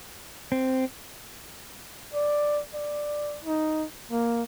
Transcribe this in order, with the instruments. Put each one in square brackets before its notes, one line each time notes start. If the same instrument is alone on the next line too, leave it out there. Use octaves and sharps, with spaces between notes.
[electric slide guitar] C4
[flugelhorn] D5
D5
D#4
A#3